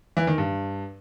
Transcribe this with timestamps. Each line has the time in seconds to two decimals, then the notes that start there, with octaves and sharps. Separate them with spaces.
0.17 E3
0.27 D#3
0.38 G2